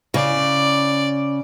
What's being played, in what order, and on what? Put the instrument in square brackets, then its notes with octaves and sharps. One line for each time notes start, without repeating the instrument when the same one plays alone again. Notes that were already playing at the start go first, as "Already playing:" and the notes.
[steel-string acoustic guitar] C#3 [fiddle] D5